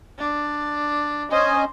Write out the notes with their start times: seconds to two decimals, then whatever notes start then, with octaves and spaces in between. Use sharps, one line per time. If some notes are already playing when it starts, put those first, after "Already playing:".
0.19 D4
1.31 C#4 C5 D#5 G#5